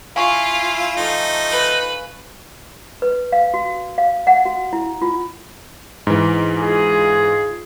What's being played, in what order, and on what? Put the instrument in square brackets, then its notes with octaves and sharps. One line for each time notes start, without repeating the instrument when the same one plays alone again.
[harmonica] E4 [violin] F4 [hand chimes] F5 G#5 C#6
[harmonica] F3 A3 D#4
[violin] B4
[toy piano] B4
F5
F#4
F5
F#5
F#4
E4
F4
[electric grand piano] G#2 E3
[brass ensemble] F4 G#4